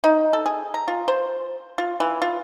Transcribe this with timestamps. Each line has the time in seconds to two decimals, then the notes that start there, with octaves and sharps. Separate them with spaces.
0.04 D#4
0.33 A4
0.46 G#4
0.74 A#5
0.88 F4
1.08 C5
1.78 F4
2.00 E3
2.22 F4